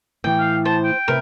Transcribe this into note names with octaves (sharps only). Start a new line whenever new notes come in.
A2 E3 G5
F5
C5 A5
G5
A2 C3 A#4 B4